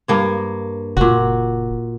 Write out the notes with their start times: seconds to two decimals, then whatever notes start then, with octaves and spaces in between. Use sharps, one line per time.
0.08 G2 A#3 C#5
0.97 F#1 A#2 F#4